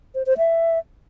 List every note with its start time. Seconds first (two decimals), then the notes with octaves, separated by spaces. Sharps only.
0.15 C5
0.26 C5
0.38 E5